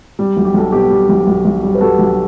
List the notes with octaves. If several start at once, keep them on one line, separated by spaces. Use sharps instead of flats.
G3
B1
G4
B1 A4
B2 G4
G3
B1
B1
B1
G3
B4
G3 F#4 A4
B1